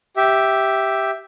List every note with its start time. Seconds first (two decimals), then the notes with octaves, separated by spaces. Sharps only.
0.17 G4 E5